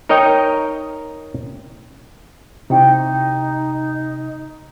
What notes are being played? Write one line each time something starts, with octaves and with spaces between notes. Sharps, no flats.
D#4 A#4 C#5 D#5 G5
C3 D#4 E4 G5 C#6